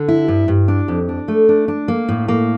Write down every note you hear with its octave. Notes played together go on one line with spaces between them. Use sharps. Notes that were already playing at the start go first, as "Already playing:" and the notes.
Already playing: D3
E4
G2
G2
D4
F2
D4
A3
D4
D4
A#3
A2
A#3